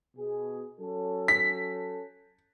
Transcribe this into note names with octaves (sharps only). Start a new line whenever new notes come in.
B2 G#4
F#3 C#4 A4
B6